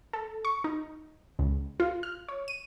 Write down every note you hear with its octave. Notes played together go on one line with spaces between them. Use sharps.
A4
C#6
D#4
C#2
F4
F6
C#5
D#7